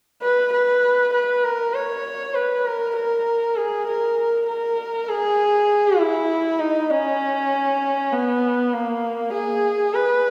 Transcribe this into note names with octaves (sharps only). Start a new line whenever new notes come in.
B4
B4
B4
A#4
C#5
B4
A#4
A#4
G#4
A#4
A#4
G#4
E4
D#4
C#4
B3
A#3
G#4
B4